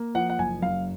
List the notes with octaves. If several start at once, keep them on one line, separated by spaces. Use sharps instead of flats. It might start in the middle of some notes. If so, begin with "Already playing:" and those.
Already playing: A#3
F3 F#5
F#5
F#1 G#5
F#2 F5